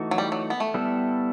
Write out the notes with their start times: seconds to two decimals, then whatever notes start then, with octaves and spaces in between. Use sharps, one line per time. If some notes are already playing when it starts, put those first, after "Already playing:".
Already playing: E3 A3 D#4 F#4
0.11 F#3
0.18 G3
0.32 F#3
0.50 B3
0.60 A3
0.74 G3 B3 E4 A4